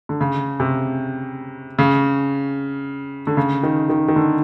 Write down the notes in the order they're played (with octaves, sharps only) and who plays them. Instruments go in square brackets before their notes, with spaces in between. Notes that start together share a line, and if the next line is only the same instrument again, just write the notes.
[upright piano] D3
C#3
C3
C#3
D3
C#3
D#3
D#3
D#3
D3